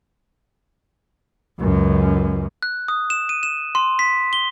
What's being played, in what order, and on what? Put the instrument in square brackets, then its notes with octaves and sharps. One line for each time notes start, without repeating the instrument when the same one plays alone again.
[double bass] C#2 F#2
[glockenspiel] F#6
D#6
E7
D#7
E7
C6
B6
G7